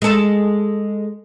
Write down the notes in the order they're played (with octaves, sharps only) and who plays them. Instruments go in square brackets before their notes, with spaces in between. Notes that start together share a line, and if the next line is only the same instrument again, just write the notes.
[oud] G#3 A4